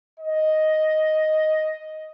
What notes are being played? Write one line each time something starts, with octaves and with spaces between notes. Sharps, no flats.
D#5